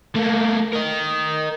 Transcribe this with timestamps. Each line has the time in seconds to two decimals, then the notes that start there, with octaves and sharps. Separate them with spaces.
0.16 A3 A#3
0.73 A#4 D#5